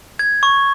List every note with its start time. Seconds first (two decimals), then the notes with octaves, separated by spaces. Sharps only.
0.19 G#6
0.43 C#6